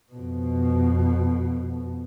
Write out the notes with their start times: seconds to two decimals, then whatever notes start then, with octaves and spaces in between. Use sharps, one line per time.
0.12 F2 B2